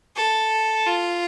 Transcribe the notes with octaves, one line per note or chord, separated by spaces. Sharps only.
A4
F4